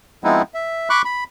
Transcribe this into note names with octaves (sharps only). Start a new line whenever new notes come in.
F3 G#3 B3 C4 D#4 E4
E5
B5 C#6 D6 F#6
B5